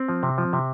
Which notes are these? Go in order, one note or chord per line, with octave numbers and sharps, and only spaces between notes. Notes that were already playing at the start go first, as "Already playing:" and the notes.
Already playing: C4
F3
C3
F3
C3